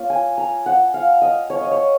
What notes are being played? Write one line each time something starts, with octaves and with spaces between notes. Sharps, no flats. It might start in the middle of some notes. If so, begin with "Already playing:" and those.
Already playing: A#3 C#4 F4
G#5
A#5
F#5
F5
D#5
C#5
D#5
C#5